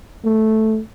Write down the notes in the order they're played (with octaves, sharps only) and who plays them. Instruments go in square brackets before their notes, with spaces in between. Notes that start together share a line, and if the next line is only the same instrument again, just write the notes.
[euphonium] A3